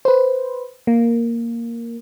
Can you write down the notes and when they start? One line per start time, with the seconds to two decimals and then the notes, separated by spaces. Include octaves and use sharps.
0.05 B4 C5
0.87 A#3